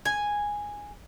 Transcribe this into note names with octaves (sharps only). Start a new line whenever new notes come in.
G#5